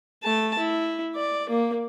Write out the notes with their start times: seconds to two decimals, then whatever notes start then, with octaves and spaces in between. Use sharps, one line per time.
0.23 A3 A5
0.59 E4
1.16 D5
1.50 A#3